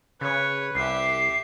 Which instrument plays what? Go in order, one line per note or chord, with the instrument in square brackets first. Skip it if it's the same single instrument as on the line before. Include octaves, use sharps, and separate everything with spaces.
[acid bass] C#3 [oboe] B4 [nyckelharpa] C#5
[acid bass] C2 [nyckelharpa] G4 E5 [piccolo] C7